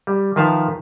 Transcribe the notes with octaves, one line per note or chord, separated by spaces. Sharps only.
G3
D#3 F3 B4 E5 F5 A5